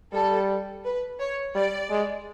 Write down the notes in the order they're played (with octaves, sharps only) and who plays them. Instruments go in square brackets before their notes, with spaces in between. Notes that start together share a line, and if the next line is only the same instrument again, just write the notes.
[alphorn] G3 [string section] A4
[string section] B4
C#5
[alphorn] G3 [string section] D5
[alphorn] G#3